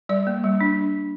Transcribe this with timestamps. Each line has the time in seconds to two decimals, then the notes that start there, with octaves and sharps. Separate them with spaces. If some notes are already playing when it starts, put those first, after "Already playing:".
0.09 G3 D5
0.27 A#3
0.44 G3
0.61 D4